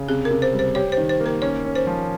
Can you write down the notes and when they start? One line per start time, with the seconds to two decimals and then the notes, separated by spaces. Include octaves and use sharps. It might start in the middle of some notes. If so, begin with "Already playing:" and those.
Already playing: C#3
0.09 C3 G#4
0.25 A#4
0.31 C3
0.42 C5
0.53 G3
0.59 C5
0.75 G4 C#5
0.92 C5
0.97 D#3
1.09 C5
1.20 A#3
1.26 A#4
1.42 C#4 C#5
1.65 C#4
1.75 C5
1.87 F3